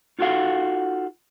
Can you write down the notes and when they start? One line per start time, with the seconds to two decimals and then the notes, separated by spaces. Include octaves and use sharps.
0.19 D#4 F4 F#4 A4 F5 F#5